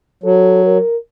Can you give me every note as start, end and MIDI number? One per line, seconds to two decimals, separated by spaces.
0.23 0.78 54
0.23 0.61 69
0.66 0.97 70